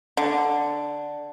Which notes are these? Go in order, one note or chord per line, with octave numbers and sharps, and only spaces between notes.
D3